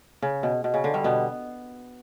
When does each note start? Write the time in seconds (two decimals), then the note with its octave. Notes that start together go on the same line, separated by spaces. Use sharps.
0.22 C#3
0.43 B2
0.64 B2
0.74 C#3
0.84 D3
0.94 G2 G3
1.04 B2 B3